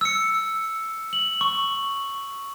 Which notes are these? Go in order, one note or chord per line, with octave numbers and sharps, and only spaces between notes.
E6 C#7
F#7
C#6